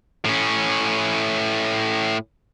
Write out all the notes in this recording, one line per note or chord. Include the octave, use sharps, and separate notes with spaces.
A2 C#4